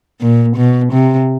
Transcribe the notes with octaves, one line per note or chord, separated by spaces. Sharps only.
A#2
B2
C3